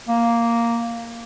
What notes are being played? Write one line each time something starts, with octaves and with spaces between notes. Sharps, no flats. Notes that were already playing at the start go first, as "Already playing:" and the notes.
A#3